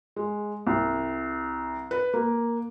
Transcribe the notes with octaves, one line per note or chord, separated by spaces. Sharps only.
G#3
C2
B4
A#3